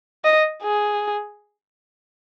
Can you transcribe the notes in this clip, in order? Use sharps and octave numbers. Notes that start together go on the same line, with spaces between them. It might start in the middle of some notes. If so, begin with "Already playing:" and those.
D#5
G#4